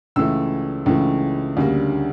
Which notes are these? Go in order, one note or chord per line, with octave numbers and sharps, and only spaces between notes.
C#2 C#3 E3 A3 E6
C#2 C#3 E3 A3
D2 C#3 G3 A#3